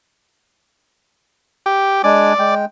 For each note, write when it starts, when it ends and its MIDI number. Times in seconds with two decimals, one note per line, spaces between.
1.66 2.02 67
2.04 2.33 56
2.04 2.33 62
2.04 2.55 74
2.04 2.33 80
2.39 2.65 56
2.39 2.65 79